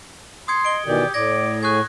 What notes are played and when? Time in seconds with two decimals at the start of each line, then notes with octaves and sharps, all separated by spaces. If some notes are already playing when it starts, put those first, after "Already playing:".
0.48 C6 D#6 G#6 C#7
0.65 D#5 D7 G7
0.86 B2 D#3 E3 G4 D5
1.14 A2 D5 D6 G#6 A#6
1.63 G#4 C#6 F#6 G#6